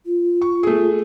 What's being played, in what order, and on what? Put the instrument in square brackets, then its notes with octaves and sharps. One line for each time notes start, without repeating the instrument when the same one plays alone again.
[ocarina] F4
[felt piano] C#6
A3 G#4